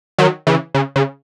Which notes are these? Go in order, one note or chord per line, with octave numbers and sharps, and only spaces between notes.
D#3 F#3
C#3 E3
C#3
C#3